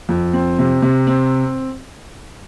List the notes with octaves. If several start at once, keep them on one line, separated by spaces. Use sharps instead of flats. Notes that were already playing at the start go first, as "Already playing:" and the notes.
F2
C4
C3
C3
C4